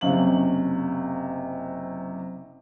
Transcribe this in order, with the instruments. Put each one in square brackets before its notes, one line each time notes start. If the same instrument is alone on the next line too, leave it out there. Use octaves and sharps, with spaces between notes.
[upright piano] F#1 C3 C#4 F5 F#7